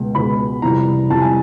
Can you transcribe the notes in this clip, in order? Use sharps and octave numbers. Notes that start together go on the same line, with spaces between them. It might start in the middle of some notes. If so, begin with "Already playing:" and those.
Already playing: C#2 B2 G#3
C#2 B2 G#3 B5
F2 C3 E3 G3 A#5
F2 C3 E3 G3 A5
G#5